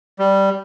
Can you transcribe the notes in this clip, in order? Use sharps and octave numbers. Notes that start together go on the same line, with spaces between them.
G3